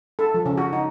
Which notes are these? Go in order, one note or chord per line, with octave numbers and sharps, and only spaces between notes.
A4
F3
C#3
F#4
D#4